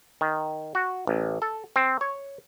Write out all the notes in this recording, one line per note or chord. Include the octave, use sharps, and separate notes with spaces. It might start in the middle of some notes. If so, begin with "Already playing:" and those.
D#3
F#4
A1
A4
C4
C#5